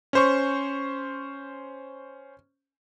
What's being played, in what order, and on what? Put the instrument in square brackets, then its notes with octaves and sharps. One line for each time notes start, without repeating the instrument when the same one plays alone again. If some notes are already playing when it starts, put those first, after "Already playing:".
[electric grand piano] C#4 C5 C#6